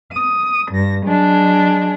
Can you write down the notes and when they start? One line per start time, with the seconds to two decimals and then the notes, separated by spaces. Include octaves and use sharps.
0.12 D#6
0.70 G2 A#6
1.03 F#3 G#3 D4